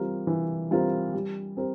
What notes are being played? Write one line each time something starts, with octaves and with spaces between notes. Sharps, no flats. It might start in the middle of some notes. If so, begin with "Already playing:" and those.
Already playing: E3 G3 C4 F4 A#4
E3
G3 C4 F4 A#4
G3
C4 G4 A#4